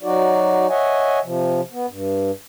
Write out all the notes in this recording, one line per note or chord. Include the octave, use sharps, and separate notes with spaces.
F#3 D#4 F#4 D5
C#5 D#5 E5 F#5 G#5
C3 F3
B3
G2